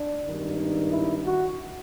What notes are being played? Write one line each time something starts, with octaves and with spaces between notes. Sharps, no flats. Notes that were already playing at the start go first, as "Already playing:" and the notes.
Already playing: D4
G#1 G2 D#3
E4
F#4